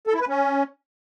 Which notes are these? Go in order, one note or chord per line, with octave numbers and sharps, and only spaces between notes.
A4
E4
B4
C#4